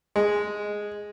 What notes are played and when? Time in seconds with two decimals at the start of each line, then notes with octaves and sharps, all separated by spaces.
0.16 G#3